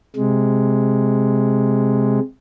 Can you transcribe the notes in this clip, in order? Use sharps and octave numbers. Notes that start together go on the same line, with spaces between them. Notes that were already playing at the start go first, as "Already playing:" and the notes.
C3 G#3